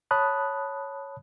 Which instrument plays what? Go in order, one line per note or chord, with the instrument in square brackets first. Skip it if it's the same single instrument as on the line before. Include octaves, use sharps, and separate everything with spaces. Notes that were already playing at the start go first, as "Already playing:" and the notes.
[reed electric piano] C#5 A5 B5 D#6 F#6